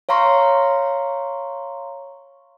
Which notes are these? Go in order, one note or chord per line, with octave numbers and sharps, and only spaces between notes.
C#5 F5 A#5 C6 C#6